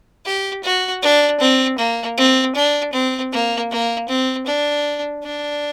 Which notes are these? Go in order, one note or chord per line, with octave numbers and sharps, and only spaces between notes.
G4
F#4
D4
C4
A#3
C4
D4
C4
A#3
A#3
C4
D4
D4